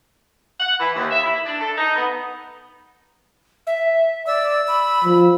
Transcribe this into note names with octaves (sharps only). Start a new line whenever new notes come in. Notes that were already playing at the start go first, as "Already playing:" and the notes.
F#5
E3
D#2
E5
E4
D4
A4
D#4
B3
E5
D5 E6
B5
F3